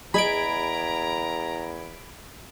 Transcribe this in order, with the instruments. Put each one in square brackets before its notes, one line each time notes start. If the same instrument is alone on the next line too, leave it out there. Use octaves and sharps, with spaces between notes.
[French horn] E2 [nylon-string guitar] G#4 D#5 [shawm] A#5 [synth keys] B5 G#6 D7